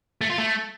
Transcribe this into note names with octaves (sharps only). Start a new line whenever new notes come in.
A3
F4
A3